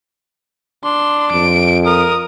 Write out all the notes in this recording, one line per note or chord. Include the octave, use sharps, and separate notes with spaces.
D4 C6
F2 D7
A#4 D#6